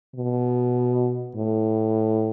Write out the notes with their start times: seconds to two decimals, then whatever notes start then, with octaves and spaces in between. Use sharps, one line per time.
0.15 B2
1.36 A2